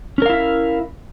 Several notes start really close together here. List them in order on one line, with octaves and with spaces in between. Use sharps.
C#4 A#4 F5 E4 E5